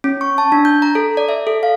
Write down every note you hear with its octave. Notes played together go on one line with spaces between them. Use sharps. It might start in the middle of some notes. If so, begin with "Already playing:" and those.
C#4
C#6
A5
D4
G6
A#5
A4
D5
E5
A4
F5